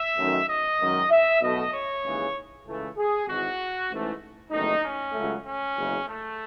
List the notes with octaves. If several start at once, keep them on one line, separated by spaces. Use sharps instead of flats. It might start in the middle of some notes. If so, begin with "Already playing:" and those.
Already playing: E5
F#2 D#3 A3
D#5
F#2 D#3 G#3
E5
B1 B2 A3 D#5
C#5
D#2 C#3 E3 G#3
C#2 C#3 E3 A3
G#4
G#1 G#2 E3 F#4
A1 G#2 E3 A3
F#1 E2 D#3 A3 D#4
C#4
C#2 C#3 F#3 A3
C#4
F#1 E2 C#3 G#3
A3